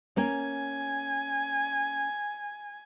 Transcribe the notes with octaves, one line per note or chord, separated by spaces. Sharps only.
A#3 C#4 G#5